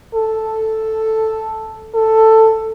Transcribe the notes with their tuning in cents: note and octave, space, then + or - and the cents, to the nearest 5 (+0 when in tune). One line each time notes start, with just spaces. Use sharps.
A4 +0
A4 +10